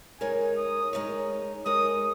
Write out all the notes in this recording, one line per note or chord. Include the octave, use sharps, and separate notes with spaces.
G#3 D#4 A#4 C#5 G#5
D#6
G#3 D#4 A#4 C#5
G#3 D#4 A#4 C#5 D#6